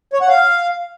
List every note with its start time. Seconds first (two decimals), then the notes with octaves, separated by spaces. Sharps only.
0.13 C#5
0.21 F#5
0.29 F5